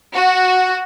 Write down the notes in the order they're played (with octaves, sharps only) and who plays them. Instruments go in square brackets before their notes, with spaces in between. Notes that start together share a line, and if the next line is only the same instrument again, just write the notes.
[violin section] F#4